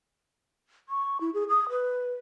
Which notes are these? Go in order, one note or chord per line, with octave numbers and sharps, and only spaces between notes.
C#6
E4
G#4
D#6
B4